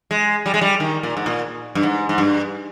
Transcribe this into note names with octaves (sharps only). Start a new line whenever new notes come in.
G#3
G3
G#3
G3
D#3
A#2
G#2
A#2
G2
G#2
G#2
G2